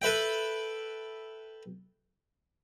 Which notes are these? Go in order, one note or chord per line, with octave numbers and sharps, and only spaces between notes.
A4 B4 E5 G5